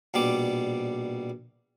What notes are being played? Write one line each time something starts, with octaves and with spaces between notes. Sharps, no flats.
A#1 B2 G3 D6